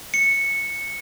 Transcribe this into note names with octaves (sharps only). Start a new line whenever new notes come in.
C#7